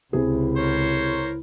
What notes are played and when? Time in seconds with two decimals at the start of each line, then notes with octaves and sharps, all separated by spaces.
0.13 C#2 C3 E4 G#4
0.56 A#4 C5 C#5